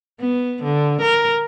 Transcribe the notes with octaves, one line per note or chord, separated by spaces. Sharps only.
B3
D3
A#4